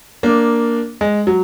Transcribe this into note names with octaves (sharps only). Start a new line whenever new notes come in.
A#3 D4
G#3
F#3